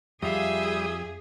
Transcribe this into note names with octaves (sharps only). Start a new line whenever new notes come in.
F2 G3 F4 G4 G#4 E5 F5 D#6